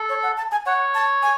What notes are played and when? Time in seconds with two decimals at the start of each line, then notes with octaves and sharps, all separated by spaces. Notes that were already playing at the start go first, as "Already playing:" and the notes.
Already playing: A4
0.09 C#5
0.23 F#5
0.37 A5
0.51 G#5
0.66 C#5 F#5
0.95 A5
1.22 G#5